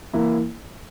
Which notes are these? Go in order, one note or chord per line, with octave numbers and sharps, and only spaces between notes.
E3 A#3 E4